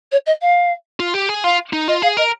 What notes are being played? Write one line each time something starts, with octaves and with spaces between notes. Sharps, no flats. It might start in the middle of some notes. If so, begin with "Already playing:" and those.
C#5
D#5
F5
F4
G4
G#4
F4 F5
D#4
F4 D#5
G#4 F5
A#4 D#5